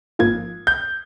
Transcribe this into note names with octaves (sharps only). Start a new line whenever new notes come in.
G#1 G#2 F3 A#3 F4 G#6
G6